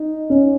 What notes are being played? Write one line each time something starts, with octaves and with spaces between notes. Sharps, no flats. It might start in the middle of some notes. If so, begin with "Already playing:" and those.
Already playing: D#4
C#4